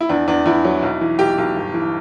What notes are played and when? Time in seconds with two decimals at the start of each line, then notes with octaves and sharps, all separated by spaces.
0.01 E4
0.09 E2 D4
0.28 E2 D4
0.46 E2 E4
0.64 F#3
0.83 B1
1.01 E3
1.19 B1 G4
1.38 B1
1.56 G1
1.74 E3